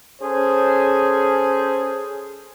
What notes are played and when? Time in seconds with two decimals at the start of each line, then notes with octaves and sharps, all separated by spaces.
0.21 C#4 G#4 A4 C5